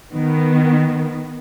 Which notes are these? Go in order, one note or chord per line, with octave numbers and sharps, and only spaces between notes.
D#3 B3